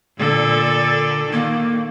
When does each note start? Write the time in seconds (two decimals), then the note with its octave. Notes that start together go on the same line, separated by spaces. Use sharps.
0.19 A#2 D3 A4
1.33 D#3 A#3